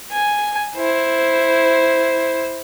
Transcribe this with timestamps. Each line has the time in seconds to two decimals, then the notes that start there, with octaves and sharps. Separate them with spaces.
0.12 G#5
0.77 E4 C5